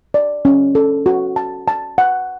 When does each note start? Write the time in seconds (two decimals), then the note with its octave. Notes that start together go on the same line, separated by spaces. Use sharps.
0.14 D5
0.45 C#4
0.75 A4
1.06 F#4
1.36 A5
1.68 A5
1.98 F#5